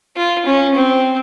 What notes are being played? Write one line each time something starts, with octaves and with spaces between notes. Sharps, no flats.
F4
C#4
C4